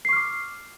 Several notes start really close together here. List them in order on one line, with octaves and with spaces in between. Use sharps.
C7 C#6 F6 D6